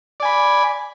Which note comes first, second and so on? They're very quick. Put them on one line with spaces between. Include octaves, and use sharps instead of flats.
D5 G#5 B5